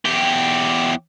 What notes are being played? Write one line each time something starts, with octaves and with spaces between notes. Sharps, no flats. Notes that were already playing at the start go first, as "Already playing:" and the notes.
E2 G4